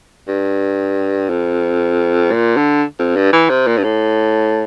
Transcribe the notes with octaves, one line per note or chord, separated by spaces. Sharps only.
G2
F2
A#2
D3
F2
G2
E3
C3
A#2
G2
A2